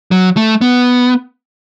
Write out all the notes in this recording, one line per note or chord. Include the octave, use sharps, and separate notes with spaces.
F#3
A3
B3